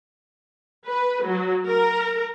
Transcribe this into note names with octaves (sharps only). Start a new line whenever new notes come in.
B4
F#3
A#4